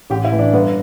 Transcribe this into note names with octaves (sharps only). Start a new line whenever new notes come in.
A1 G4
E4
A2 E3
D4
G1 B3